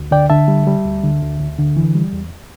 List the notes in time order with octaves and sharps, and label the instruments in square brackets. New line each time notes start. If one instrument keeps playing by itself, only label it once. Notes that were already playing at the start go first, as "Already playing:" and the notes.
Already playing: [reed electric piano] D2
D3 D5 G5
D3 E5 A5
G3
G3
D2
D3
D2
D2
D3
E3
G3
E2